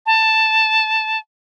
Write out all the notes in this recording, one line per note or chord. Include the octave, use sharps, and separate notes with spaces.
A5